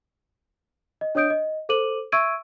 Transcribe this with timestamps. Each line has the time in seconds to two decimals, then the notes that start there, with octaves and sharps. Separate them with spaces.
1.01 D#5
1.15 D4 C#5 D#5 D#6 G6 D7
1.30 D#5
1.69 A4 C5 D6 D#7 F#7
2.12 E5 C#6 E6 G#6 D7 D#7